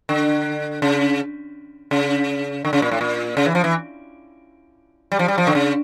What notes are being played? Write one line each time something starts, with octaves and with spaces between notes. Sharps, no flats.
D3
C#3
C#3
D3
C#3
A#2
A2
A#2
C#3
E3
F3
E3
G3
F3
G3
F3
D3
C#3